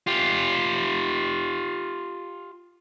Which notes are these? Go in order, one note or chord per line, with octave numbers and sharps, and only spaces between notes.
F4 G4